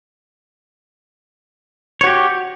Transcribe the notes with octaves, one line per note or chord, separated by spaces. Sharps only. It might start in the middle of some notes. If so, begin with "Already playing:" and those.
F#4 G4 C#5